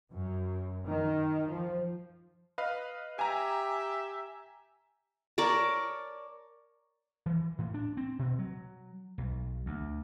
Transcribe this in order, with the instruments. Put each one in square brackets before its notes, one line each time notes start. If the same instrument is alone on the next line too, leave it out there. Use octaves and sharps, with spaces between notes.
[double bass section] F#2
D#3
F3
[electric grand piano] B4 D#5 F5
[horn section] G4 E5 [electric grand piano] G#5 A#5
[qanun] A#4 C#5 D5 A5
[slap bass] E3
A2
D4
C4
B2
F#3
B1
D2